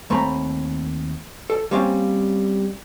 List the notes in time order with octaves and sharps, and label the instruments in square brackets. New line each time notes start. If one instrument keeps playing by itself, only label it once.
[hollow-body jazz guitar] D#2 A3 C4 A#5 B5
A4
G3 A#3 C4 C#4 F5